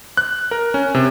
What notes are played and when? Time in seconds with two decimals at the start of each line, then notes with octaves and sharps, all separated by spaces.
0.17 F#6
0.51 A#4
0.74 C#4
0.95 C3